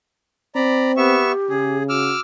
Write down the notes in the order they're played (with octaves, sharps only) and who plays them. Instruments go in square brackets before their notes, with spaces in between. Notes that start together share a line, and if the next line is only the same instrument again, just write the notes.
[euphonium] C4 [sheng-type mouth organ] D5 A#5 B5
[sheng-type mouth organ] B3 E5 C#6 [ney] G4
[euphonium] C#3 [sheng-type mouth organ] G#4
[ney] F#4 [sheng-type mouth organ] D6 E6 F6